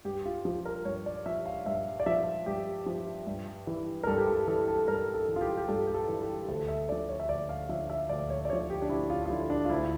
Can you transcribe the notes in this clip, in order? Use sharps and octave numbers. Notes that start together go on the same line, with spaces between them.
G2 G4
F4
F3 F4
A#4
G2 C#5
D5
F3 E5
F5
G2 E5
D5
F3 E5
G2 G4
F3
G2
E3
A#4
G2 A4
G4
A4
E3 A4
A4
G2 A#4
A4
E3
F4
G4
G4
G2 A4
G4
A4
E3
G4
D2 A4
E5
D3 F3 D5
C#5
E5
D2 D5
F5
D3 F3 E5
E5
D2 D5
C#5
D5
D3 F3 C#5
G4
D4
D2 E4
F4
F4
D3 F3 E4
D4
F4
D2 E4